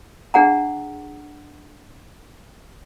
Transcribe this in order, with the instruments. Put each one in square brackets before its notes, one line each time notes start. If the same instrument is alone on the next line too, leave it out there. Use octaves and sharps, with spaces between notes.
[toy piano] D4 G#4 F#5 A#5